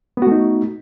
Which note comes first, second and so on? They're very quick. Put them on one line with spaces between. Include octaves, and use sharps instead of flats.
B3 F#4 A3 D#4